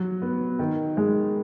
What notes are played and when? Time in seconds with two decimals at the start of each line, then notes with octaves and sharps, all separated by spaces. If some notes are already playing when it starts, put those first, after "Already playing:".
Already playing: F#3
0.22 B3
0.59 D#3
0.97 G#3